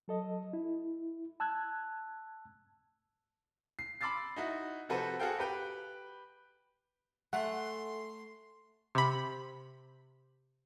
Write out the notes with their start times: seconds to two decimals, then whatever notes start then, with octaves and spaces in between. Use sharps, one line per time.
0.08 F#3 A4 D#5
0.53 E4
1.40 A5 E6 F#6 G#6
3.79 C7
4.01 B5 C6 D6 E6 A6 C7
4.36 D#4 E4 F#4
4.89 C3 F3 F#4 A4 B4 C5
5.20 F#4 G#4 A4 F5 G5
5.39 G4 B4 G5
7.33 A3 A4 E5 F#5 G#5 C6
8.95 C3 B5